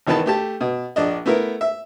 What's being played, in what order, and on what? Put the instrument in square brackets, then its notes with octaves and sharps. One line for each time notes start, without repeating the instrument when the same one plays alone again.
[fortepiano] G#1 D#3 E3 B3 B4 A5
A3 G4 A5
B2
A#1 D4 D#5
A3 B3 E4 A#4
E5